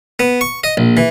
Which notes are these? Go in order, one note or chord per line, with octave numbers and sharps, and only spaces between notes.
B3
C#6
D#5
A#1
E3